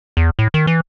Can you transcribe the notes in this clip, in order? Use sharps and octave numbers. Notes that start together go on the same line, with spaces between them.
E2
A2
D#3
E3